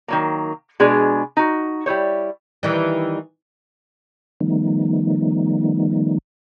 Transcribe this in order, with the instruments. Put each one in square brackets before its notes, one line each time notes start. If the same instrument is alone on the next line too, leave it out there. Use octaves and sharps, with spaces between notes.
[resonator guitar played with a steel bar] D#3 F#3 A#3
B2 G#3 D4 G#4
D#4 F#4
G3 E4 C5 C#5
[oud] D#3 E3 G3
[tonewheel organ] D#3 F3 G3 A3 B3 D#4